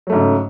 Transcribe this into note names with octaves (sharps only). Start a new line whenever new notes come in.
G#2 C#3 F#3 A3